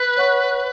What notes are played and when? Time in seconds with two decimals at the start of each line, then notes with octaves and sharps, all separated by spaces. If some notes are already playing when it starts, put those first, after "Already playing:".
Already playing: B4
0.17 C#5 F#5 C#6